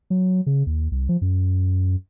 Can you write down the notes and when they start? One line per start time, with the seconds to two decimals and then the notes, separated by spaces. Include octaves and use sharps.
0.10 F#3
0.46 C#3
0.67 D#2
0.92 C2
1.09 F3
1.21 F#2